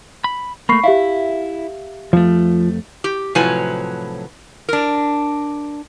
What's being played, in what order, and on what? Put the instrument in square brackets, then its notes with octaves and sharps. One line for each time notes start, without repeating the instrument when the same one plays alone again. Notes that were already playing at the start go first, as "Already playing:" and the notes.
[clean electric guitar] B5
[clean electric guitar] A3 A#3 [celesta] B5 C#6 C7
[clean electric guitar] E4 [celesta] G4 E5 F5
[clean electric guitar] F2 A3 [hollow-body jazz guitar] F3
[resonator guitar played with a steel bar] G4
A2 C3 F3 F#3 B4 G#5
D4 A#4